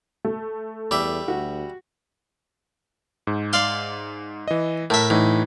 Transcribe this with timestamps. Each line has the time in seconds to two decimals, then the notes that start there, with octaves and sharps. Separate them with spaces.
0.25 A3
0.91 E2 G3 E5 D6
1.28 D2 F#4
3.27 G#2
3.53 D5 F5 C6
4.48 E3 D#5
4.90 A2 A#4 E5 A5
5.10 A2 E3 D#4